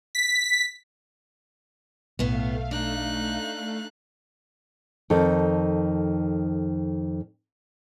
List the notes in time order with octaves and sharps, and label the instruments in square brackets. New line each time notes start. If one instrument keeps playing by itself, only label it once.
[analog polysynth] B6
[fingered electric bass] B1 [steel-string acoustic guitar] A2 B3 [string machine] A3 F5
[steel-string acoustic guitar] D4 [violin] D#4 F#6
[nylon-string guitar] F2 D#3 A4